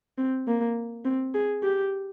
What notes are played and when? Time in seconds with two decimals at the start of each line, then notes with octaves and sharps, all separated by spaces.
0.18 C4
0.47 A#3
1.05 C4
1.34 G#4
1.63 G4